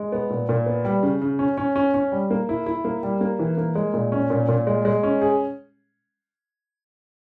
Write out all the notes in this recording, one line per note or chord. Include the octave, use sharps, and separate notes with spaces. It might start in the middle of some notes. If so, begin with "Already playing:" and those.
Already playing: G#3
B3
A#2
A#2
B3
G3
C#3
C#3
C#4
C#4
C#4
C#4
G3
A#3
E4
E4
A#3
G3
A#3
E3
A#3
G#3
A#2
C#4
A#2
A#2
G#3
G#3
C#4
G#4